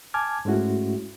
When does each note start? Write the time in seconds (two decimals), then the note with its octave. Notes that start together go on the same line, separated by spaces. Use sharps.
0.14 G#5 A5 D6 F6 G#6
0.45 G#2 G#3 A3 C#4 E4 F#4